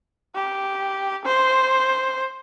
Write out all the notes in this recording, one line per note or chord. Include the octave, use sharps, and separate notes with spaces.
G4
C5